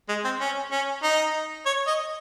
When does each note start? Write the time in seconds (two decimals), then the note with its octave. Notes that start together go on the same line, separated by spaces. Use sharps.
0.09 G#3
0.25 C4
0.41 C#4
0.72 C#4
1.04 D#4
1.66 C#5
1.87 D#5